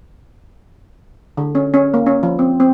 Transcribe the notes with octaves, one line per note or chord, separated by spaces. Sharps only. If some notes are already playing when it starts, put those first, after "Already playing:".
D3
C#4
C#4
A#3
C#4
F3
C4
C4